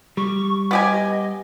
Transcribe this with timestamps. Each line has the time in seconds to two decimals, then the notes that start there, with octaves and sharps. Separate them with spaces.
0.17 G3 C#6
0.71 B3 G4 D#5 G#5